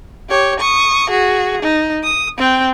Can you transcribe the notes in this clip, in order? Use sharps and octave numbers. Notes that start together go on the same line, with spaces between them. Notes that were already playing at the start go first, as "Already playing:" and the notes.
G4 C#5
C#6 D#6
F#4 G#4
D#4
D#6
C4 G5